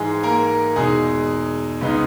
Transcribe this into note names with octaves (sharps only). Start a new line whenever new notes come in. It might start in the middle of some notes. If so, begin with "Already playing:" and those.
Already playing: G#2 E3 G#3 G#4
A#3 A#4
E2 B2 G#3 D#4 G#4
C#2 C#3 G#3 B3 D#4